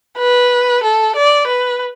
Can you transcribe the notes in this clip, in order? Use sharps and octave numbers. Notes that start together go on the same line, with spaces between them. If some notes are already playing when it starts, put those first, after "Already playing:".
B4
A4
D5
B4